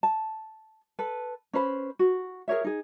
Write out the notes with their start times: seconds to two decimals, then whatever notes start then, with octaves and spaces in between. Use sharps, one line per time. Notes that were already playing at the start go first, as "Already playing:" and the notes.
0.03 A5
0.99 A4 B4
1.53 C#4 B4 C5 B5
1.99 F#4
2.48 G#4 A#4 C#5 E5
2.64 D#4 G#4